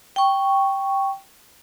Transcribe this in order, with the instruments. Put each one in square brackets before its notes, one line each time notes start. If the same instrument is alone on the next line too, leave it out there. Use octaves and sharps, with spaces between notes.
[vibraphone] G5 C#6